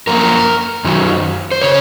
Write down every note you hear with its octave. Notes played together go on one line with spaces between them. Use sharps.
F#2 F3 A#3 A#4
F#2 D#3 F#3
C5
C#3 C#5